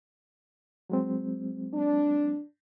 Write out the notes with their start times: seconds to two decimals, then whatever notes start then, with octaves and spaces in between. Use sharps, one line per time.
0.90 F#3 G#3 C4
1.73 D4